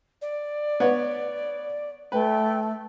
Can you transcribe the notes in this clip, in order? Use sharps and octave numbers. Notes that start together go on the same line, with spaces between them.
D5
B3 B4 C#5
A3 B4 G5